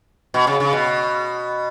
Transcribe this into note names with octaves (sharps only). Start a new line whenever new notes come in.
B2
C#3
C#3
B2